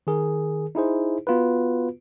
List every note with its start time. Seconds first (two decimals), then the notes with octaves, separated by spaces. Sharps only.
0.07 D#3 G#4 A#4
0.75 D#4 E4 G#4 C5
1.27 B3 F4 F#4 B4